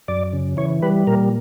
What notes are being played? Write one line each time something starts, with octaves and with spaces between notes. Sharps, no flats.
F#2 D5
C#3
E3 C#5
G3 B4
A#2 A#4